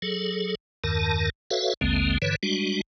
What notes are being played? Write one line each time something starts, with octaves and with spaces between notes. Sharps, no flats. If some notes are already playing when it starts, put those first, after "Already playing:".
F#3 G#4 A4
E2 G2 D#3 A#4 A5
F#4 A4 B4 C#5 E5 F5
A1 D#2 D3 G#3 A#3 C4
G2 D3 E3 B4 C#5
G3 G#3 D4 F#4